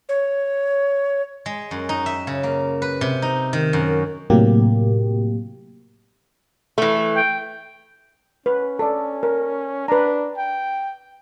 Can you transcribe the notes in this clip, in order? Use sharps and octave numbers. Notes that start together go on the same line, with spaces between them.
C#5
G#3
F#2
D#4
E5
C#3
A#3
B4
C3
D#4
D#3
F#2
A2 C3 F#3 A#3 G4
E3 A3
G5
C#4 B4
A4 D5
A#4
D4 B4 A#5
G5